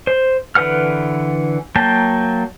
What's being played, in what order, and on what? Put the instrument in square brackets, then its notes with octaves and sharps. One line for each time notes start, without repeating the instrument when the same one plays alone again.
[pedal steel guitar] C5
D3 E3 B4 F#5 F6
F#3 A#3 G5 A5